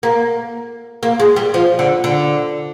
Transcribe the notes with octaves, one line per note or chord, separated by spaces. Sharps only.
A#3
A#3
G#3
G3
F3
D3
D3